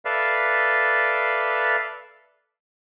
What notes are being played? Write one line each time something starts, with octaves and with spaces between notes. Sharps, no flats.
A4 B4 D5 E5 F5